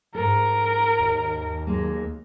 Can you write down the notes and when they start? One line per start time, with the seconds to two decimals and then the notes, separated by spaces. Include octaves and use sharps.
0.15 G#2 A4 A#4
1.00 D#2
1.67 F#3 G#3 A#3